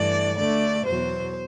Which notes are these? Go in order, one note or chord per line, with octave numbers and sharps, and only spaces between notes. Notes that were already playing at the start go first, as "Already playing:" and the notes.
Already playing: G2 E3 A3 D5
D2 D3 A3 D5
E2 B2 F#3 C5